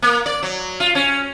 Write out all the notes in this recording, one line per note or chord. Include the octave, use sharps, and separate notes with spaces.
A#3
D5
F#3
F4
C#4